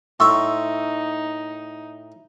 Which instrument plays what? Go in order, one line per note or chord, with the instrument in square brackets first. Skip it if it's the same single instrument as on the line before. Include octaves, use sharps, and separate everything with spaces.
[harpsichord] A2 E5 [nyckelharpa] D#4 [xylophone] C6 C#6 E6